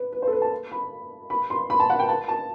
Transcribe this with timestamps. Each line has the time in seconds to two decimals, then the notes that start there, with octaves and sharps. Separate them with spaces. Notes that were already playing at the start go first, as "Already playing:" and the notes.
Already playing: B4
0.12 B4
0.22 C5
0.27 A4
0.32 B4
0.42 A5
0.72 B5
1.30 B5
1.50 C6
1.70 B5
1.80 A5
1.90 F#5
1.99 G5
2.08 A5
2.28 A5